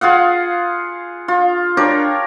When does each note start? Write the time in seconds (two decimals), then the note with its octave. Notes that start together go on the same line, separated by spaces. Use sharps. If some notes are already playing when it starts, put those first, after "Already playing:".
0.01 F4 G#4 F5 F#5
1.28 F4
1.77 D4 G4 A#4 C#5